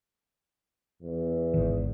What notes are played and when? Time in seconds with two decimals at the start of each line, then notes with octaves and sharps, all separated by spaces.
1.02 E2
1.54 G#1 D#3